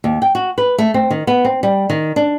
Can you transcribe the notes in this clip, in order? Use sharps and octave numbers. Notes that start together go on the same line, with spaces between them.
D#2
G5
F#4
B4
A3
C4
D#3
B3
C4
G3
D#3
D4